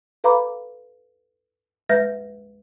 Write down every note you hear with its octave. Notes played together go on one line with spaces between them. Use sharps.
A4 B4 F5 A#5 B5 D6
G#3 B4 E5 F6 G6 A#6